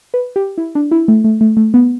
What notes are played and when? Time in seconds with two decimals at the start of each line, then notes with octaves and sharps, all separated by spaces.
0.14 B4
0.36 G4
0.58 E4
0.75 D4
0.91 E4
1.08 A3
1.24 A3
1.41 A3
1.57 A3
1.74 B3